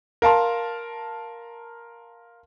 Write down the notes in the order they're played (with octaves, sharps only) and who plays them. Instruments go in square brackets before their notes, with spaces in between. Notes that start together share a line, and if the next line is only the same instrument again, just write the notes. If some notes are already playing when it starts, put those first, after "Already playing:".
[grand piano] A#4 F5 A5 C6